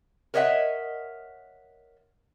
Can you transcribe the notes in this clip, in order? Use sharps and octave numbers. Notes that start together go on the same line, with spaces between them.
A#4 C#5 D#5 E5 F#5